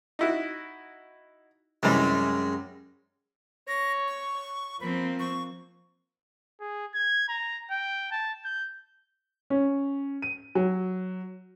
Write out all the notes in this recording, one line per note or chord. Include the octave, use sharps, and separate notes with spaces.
D#4 E4 F#4
F#2 C3 E3 G3 G#3
C#5 A#6
C#6
F3 A#3 C4 B5
C#6
G#4
G#6
A#5
G5
A5
G6
C#4
D#7
F#3